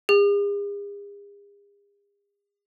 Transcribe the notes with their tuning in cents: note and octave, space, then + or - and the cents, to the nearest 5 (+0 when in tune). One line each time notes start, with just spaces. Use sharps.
G#4 -45